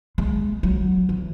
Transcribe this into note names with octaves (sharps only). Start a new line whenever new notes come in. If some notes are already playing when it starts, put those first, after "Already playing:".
G#3
F#3
E3